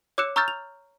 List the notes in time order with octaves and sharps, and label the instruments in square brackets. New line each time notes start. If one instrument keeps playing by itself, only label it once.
[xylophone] C#5 D6 E6 F#6 C#7 E7
A#5 C#6 E6 F6 G6 A6
F7